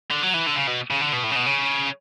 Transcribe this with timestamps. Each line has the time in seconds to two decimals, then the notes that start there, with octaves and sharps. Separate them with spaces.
0.11 D3
0.22 F#3
0.34 E3
0.46 D3
0.56 C#3
0.67 B2
0.90 C#3
1.01 D3
1.13 B2
1.24 A2
1.31 C#3
1.36 B2
1.46 C#3